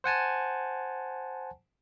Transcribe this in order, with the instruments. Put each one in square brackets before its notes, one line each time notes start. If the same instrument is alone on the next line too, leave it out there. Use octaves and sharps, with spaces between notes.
[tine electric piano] C5 F#5 G#5 A5